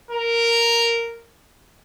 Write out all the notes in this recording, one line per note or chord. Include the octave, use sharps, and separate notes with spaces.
A#4